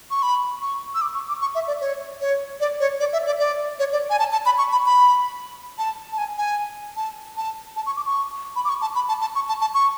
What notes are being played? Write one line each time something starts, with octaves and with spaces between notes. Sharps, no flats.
C#6
B5
C#6
E6
D6
C#6
D6
C#6
E5
D5
C#5
C#5
D5
C#5
D5
E5
D5
D5
C#5
D5
G#5
A5
A5
B5
C#6
B5
B5
A5
A5
G#5
G#5
A5
A5
A5
C#6
D6
C#6
B5
D6
C#6
A5
B5
A5
A5
C#6
A5
A5
C#6